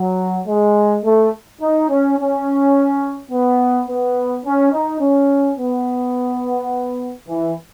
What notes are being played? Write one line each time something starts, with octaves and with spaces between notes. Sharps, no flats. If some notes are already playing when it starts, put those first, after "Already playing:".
Already playing: F#3
G#3
A3
D#4
C#4
C#4
B3
B3
C#4
D#4
C#4
B3
E3